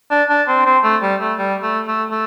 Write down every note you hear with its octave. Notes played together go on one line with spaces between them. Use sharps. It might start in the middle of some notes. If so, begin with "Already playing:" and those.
D4
D4
C4
C4
A3
G3
A3
G3
A3
A3
A3